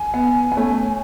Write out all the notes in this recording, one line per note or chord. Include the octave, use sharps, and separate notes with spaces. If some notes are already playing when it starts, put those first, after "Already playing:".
Already playing: G#5
B3
B3
A3 C#4